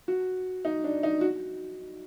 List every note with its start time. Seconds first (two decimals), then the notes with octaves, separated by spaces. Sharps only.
0.08 F#4
0.65 D#4
0.84 D4
1.03 D#4
1.21 F#4